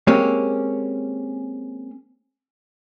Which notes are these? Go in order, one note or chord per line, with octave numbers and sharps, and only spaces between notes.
G#3 A#3 C4 C#4 G4